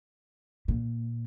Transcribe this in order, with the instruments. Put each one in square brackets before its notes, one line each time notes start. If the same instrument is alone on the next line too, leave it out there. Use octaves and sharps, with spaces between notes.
[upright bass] A#2